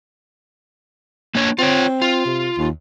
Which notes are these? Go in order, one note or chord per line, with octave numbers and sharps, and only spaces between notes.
A#3 D4 C#5
C4 F4 C#5
F4
C3
D#2